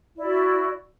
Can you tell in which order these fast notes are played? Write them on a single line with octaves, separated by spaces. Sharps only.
E4 D5 F#4